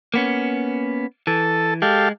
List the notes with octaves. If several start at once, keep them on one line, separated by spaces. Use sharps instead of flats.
A#3 B3 C#4
E3 A4
G#3 G4 A4 F5